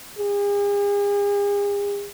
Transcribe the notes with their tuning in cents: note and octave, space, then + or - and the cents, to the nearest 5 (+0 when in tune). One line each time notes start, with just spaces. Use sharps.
G#4 -40